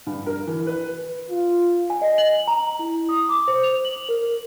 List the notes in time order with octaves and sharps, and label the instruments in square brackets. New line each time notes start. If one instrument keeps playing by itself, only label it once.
[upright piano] G2
A#4
E3
B4
[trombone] F4
[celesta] G#5
D#5
F#7
A#5
E4
D#6
D6
C5
F7
F#7
A#4